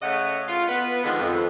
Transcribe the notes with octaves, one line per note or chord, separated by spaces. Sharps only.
C#3 A3 C#5 D#5 F#5
F4
B3 B4
D3 D#3 F3 G#3 F4 F#5
F2